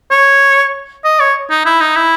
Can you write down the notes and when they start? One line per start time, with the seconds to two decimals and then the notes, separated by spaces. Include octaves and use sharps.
0.11 C#5
1.05 D#5
1.20 C#5
1.50 D#4
1.65 E4
1.81 D#4
1.96 E4